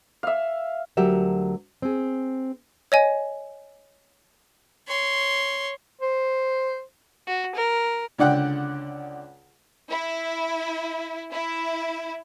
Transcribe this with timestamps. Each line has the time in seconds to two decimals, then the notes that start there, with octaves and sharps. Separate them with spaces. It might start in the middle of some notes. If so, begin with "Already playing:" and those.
0.23 E5 F5
0.97 D2 F#3 G4 A#4 E5 F#5
1.82 C4 G#4
2.92 C#5 D#5 G#5
4.87 C#5 C6
6.02 C5
7.27 F#4
7.55 A#4
8.18 C#2 D3 D5 F#5 G5 F#6
9.88 E4
11.30 E4